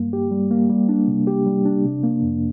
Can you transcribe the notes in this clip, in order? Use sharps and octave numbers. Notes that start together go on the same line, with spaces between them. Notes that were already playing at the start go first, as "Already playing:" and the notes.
Already playing: G2 G3 A#3
G4
G3
A#3
G3
D4
C3
G4
G3
D4
C3
A#3
F2